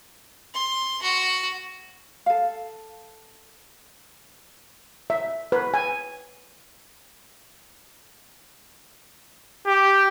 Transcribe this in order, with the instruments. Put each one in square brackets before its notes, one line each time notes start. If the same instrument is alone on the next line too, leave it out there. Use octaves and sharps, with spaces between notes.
[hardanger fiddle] C6
F#4
[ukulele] A4 F5
[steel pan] E5
B4
G#5
[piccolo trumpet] G4